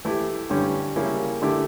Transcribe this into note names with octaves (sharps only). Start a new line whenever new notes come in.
E3 A3 E4 G4
G2 D3 G3 C#4
C#3 G3 A#3 C#4 E4
D3 A3 E4 G4